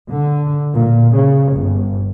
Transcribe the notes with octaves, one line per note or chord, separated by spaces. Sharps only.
D3
A#2
C#3
G1